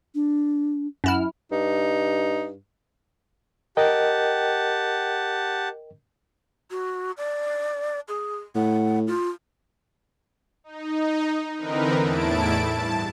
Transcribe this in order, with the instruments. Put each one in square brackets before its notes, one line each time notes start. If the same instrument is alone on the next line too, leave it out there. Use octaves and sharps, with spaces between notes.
[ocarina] D4
[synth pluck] F#2 E4 F6
[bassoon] G2 [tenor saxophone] D#4
[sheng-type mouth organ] G4 F#5 A5 [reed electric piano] A#4 D#5 G5
[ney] F#4
D5
G#4
[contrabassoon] A2 [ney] F#5
[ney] F4
[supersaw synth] D#4
D3 E3 C4 D#4 A#4 B4
E2 A2 E4 A5 D7
G2 A5